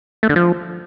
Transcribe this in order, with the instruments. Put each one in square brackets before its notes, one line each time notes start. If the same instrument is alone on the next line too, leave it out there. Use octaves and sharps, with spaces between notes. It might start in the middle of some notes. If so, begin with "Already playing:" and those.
[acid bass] A3
D3
F3